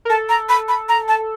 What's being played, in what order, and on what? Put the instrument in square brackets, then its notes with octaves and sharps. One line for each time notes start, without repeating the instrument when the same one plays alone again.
[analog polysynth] A#4
[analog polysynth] A4 [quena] A5
[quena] A#5
B5
B5
A#5
A5